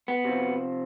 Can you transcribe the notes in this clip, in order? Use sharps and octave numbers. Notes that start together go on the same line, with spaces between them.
B3
C3 F3